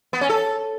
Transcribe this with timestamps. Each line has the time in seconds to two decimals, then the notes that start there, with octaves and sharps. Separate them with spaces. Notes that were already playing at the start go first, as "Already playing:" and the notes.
0.13 B3
0.21 C#4
0.29 A4